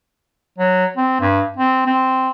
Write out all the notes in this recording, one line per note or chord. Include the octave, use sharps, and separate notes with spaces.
F#3
C4
G2
C4
C4